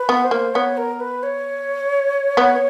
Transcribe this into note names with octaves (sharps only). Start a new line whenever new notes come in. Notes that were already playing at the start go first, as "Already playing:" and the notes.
Already playing: B4
B3
C5
A#3
B3 C#5
A#4
B4
C#5
B3